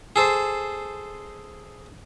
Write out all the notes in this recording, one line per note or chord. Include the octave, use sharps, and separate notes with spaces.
G#4 A4 C5